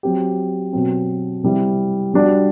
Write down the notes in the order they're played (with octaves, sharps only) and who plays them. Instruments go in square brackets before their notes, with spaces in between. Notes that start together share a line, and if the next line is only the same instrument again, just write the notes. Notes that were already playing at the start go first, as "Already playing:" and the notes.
[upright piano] F#3 C4 G4
B2 F#3 C4
C3 G3 C4 E4
G3 D4 F#4